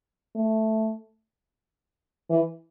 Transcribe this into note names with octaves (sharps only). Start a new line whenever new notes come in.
A3
E3